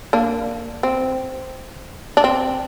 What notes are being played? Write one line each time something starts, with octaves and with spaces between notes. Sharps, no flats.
A#3 D4
C4
D4
C4